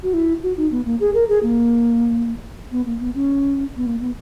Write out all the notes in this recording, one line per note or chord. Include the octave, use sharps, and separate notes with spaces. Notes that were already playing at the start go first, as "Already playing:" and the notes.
F#4
E4
F#4
D#4
B3
A#3
G#4
A#4
G#4
A#3
B3
A#3
B3
C#4
B3
A#3
B3